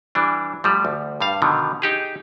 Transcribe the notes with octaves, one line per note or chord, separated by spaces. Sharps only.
E3 G3 D4
F3 G3 A3
D2
G2 G3 F5
B2 D3 D#3 F3
D#4 G4 G#4